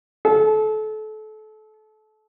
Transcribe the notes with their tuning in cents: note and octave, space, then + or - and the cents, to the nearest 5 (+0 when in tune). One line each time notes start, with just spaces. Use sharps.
A4 -30